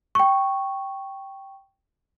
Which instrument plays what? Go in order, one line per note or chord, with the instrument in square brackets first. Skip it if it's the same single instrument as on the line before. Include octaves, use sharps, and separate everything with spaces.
[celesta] G5 C#6